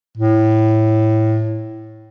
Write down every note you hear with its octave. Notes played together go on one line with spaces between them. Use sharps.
A2